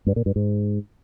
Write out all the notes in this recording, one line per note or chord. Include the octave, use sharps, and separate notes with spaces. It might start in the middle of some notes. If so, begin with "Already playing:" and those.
G2
A#2
G2
G#2